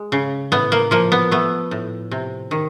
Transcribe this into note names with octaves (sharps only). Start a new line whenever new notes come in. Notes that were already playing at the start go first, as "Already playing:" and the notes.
Already playing: G#3
C#3
A2 B3
A#3
F3 A#3
B3
A3 B3
A2
C3
D#3